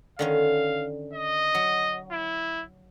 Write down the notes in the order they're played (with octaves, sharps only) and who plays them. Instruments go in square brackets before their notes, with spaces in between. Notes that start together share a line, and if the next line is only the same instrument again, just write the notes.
[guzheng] D3 D#3 C#4 [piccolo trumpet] F5
[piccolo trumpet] D#5
[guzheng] F#3
[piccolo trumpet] E4